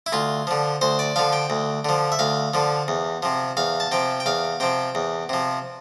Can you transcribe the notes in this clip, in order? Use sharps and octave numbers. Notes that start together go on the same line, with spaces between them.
E4
D2 F4
D3 F3
D2 C5
D5
D3 F3 F5
G5
D2
D3 F3
E5
D2 F5
D3 F3
E2
C3 F3
E2 F5
A5
C3 F3 G5
G5
E2 F5
C3 F3 G5
E2
C3 F3